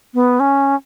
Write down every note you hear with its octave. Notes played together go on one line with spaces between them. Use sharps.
B3
C#4